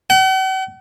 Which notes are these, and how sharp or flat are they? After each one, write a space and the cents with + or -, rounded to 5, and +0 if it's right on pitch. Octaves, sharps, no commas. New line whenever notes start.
F#5 +45